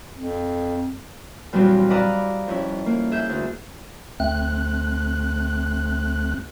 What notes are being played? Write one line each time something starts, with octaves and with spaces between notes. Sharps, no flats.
F2
E2 A#2 F#3 G3 A#3 C4
B4 D5 D#5 F5 A#5 E6
F2 C#4 E4
A#3
G#4 E5 G6
D2
D2 A3 C4 F#6